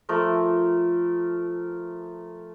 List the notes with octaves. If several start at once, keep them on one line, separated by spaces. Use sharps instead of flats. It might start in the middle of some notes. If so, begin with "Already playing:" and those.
F3 A3 A#4